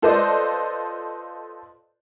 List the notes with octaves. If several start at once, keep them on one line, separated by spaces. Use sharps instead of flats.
F4 A4 B4 C5 D5 D#5